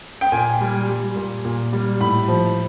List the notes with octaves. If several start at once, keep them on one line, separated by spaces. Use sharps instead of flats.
G5
A#2 G#5
G3
G3
A#2
A#2
G3
A2 B5
F3